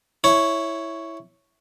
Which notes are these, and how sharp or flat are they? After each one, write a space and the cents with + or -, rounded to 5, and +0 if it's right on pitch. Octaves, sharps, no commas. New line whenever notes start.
E4 +0 C#5 +0